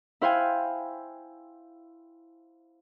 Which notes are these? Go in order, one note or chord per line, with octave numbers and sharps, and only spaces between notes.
E4 C5 F5 G5 G#5